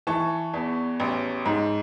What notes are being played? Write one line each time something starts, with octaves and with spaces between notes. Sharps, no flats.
E3 A5 C#6
E2
A1
G#2